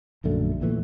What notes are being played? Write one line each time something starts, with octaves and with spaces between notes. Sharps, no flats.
A#1 F#2 D3 A3
E2 A#2 E3 A3